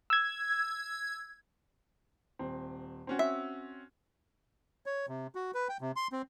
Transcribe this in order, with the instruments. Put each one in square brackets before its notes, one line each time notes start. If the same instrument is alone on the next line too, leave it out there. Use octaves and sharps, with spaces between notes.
[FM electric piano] E6 G#6
[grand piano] D#1 C4
C4 C#4 F#4
[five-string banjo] E5
[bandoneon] C#5
C3
F#4
B4
G5
C3
C6
C4